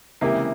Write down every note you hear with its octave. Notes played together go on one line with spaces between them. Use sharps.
C#2 C3 E3 A#3 E4